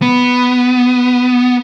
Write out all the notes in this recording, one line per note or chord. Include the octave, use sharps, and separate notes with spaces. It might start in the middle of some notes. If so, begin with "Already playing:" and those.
B3